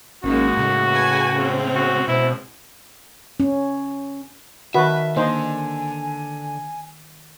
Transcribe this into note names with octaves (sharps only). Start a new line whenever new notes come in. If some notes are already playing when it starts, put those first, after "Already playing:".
G#1 G#3 A#3 C#4 D#4 F#4
A2 C#3
B4 G#5
G#3 C4 C#4
F#4
B2 E4 C5
C#4
D#3 F#4 B4 E5 A5
D3 A#3 D#4 C5 G#5